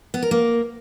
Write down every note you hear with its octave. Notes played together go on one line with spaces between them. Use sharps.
B3
A#4
A#3